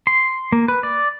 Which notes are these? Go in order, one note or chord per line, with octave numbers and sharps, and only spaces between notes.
C6
A#3
B4
D5